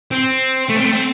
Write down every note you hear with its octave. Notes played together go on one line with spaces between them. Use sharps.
C4
A3
C4
A3
C4